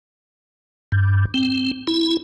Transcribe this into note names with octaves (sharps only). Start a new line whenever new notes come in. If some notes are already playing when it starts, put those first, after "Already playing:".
G2
C4
E4